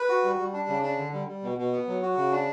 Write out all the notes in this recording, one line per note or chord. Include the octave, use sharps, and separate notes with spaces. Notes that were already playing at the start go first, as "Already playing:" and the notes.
Already playing: B4
F#4
G3
G3
D4
C#3
D4
D3
G3
G3
B2
B2
B3
F#3
F#4
C#3
D4